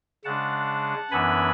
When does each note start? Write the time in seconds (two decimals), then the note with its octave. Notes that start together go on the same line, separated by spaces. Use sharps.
0.25 C#3 G#3 D4 F#5 A5
1.11 F#2 E3 B3 D4 G#5 B5